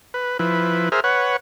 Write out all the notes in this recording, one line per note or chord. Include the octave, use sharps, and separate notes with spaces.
B4
F3 E4 B4
G#4 A#4 C5 E5 F6
B4 C#5 F#5